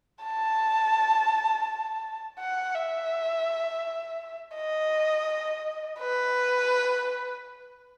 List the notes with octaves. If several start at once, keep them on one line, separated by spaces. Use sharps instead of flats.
A5
F#5
E5
D#5
B4